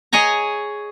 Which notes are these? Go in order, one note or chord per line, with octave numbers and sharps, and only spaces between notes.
G#4 C#5 D#5 G#5 A#5